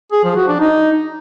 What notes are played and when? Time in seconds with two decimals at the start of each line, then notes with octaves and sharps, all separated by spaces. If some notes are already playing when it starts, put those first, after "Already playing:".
0.12 G#4
0.24 F3
0.36 F#4
0.48 D4
0.60 D#4